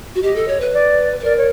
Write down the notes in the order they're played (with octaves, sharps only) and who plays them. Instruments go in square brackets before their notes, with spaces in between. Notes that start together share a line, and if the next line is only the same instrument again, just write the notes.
[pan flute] F#4
[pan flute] G4 [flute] D#5
[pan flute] A4
C#5
B4
[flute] D5
[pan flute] B4
[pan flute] A#4 [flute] D5
[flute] C#5